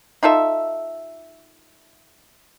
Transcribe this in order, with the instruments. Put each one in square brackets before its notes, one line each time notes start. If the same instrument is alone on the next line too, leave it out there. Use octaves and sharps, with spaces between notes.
[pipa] D#4 F4 A4 E5